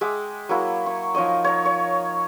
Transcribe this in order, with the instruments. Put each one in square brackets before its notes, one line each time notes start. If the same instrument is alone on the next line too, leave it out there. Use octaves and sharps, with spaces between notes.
[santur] G#3 E5 G5 D6
F#3 A#3 E4
C#6
F3 D#4 C#5 D#5
C#5 A#5
C#5